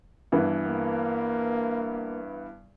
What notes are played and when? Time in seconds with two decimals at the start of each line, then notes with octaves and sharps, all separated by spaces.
0.32 G2 E3 B3
0.66 A#3